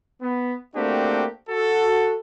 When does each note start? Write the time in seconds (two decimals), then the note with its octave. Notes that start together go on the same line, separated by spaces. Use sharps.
0.22 B3
0.76 A3 A#3 C4 D4 F#4 G4
1.49 F#4 A4